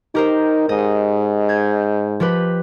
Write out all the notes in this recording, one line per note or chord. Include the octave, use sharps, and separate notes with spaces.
D#4 G4 A#4 C5
G#2 D#5
G6 G#6
F3 G4 B4